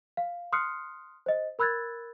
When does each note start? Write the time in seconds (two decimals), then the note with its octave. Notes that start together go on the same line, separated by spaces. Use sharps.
0.17 F5
0.52 C6 D#6 F6 F#6 C7 C#7
1.26 C5 D#5
1.59 A#4 B5 E6 F#6 G#6 A6